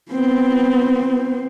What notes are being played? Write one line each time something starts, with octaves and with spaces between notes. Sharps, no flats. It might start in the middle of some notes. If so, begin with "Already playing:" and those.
B3 C4